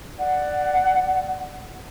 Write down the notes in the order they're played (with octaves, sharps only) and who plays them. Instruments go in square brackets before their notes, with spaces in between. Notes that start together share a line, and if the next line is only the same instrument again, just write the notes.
[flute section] D5 F#5